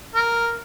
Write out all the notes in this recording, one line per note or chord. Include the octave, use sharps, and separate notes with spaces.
A#4